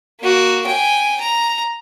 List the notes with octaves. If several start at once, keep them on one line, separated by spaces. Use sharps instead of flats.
A#3 F#4
G5 G#5
A#5